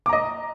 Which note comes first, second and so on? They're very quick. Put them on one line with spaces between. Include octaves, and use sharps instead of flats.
D6 A#5 D#5